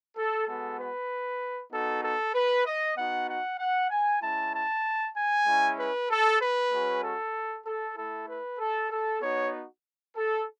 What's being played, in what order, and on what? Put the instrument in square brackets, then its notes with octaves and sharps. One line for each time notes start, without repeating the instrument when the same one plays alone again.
[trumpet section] A4
G#3 B3 F#4 A4
B4
B3 D#4 F#4 A4
A4
B4
D#5
B3 D#4 F#4 F#5
F#5
F#5
G#5
G#3 C#4 E4 A5
A5
G#5
G#3 C#4 E4
B4
A4
B4
G#3 C#4 F#4
A4
A4
A3 E4 A4
B4
A4
A4
B3 D#4 F#4 C#5
A4